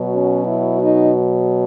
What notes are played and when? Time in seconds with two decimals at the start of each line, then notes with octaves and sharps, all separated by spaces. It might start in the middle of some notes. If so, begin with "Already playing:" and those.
Already playing: B2 F#3
0.13 C#4
0.46 E4
0.81 D#4